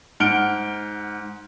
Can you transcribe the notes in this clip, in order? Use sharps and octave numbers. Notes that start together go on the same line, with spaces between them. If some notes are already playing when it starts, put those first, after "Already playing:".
G#2 F#5 F6 D7 G7